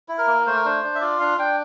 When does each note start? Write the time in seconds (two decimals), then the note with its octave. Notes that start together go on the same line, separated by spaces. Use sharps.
0.09 E4
0.18 A#4
0.27 A#3
0.46 A3 C5
0.56 A#4
0.65 D4 C5
0.84 D4
0.95 E5
1.01 F4 D5
1.20 D4 F5
1.38 D4 G5